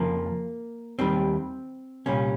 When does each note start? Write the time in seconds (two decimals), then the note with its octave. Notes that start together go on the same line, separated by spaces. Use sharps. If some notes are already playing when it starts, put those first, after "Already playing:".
Already playing: F2 C#3 F3 A#3
0.99 D#2 D#3 G3 C4
2.06 C2 A#2 G3 C#4